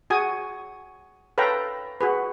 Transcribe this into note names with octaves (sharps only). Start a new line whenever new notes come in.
F#4 G#4 G#5 D#6
A4 B4 C#5 F5 G5 A#5
F#4 G#4 B4